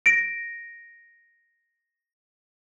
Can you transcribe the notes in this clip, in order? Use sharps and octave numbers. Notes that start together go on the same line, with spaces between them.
A#6 D7